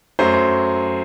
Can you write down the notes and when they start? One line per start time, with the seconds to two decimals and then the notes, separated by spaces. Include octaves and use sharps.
0.19 F#2 F#3 A3 C5
0.34 C5